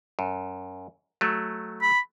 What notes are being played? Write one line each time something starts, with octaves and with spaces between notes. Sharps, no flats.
F#2
F#3 A3
B5